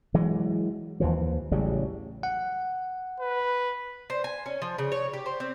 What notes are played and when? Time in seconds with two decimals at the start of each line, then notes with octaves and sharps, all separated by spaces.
0.14 E3 F#3 G#3
1.00 D#2 E3 F3
1.52 A1 C#3 F#3 G3
2.23 F#5
3.20 B4
4.10 C5
4.24 G#5
4.46 C#4
4.62 F3
4.78 C#3
4.92 C#5
5.13 G4
5.26 C5
5.40 C4